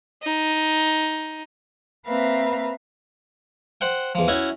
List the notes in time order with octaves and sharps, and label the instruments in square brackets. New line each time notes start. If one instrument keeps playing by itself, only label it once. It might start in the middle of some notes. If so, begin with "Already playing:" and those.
[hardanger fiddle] D#4
[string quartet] A#3 C4 B4 E5 F5 A#5
[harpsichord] C5 F#5 G5
E2 F3
C#4 E4 F#4